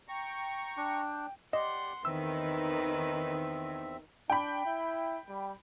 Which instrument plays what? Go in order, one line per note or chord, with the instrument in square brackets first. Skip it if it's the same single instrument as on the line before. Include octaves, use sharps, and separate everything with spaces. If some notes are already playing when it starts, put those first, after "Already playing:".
[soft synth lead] G5 [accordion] A#5 C#6
[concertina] D4
[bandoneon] G4 D5 [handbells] D#5 [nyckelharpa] F#5 C6
[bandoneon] E2 C4 E5 [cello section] D#3 [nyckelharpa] B4 [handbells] E6
[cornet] D4 [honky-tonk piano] G5 B5
[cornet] E4
G3